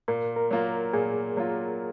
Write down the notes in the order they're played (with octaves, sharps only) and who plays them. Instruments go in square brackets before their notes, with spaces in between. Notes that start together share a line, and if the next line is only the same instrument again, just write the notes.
[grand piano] A#2 [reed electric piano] A#4
[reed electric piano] A#4
[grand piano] F#3 A#3 F4
[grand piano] A#2 [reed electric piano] G#4
[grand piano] F#3 A#3 F4